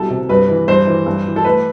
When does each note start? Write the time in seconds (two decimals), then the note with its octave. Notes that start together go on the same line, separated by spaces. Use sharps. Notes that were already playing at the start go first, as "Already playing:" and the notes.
Already playing: C2 B2 A4
0.10 C3
0.29 G2 B4
0.49 E3
0.68 G2 C5
0.87 E3
1.06 G2
1.26 E3
1.36 A4
1.44 A3 B4